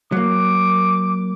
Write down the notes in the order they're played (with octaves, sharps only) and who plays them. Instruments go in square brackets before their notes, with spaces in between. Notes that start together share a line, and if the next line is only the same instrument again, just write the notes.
[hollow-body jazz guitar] F#3 A#3 [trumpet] D6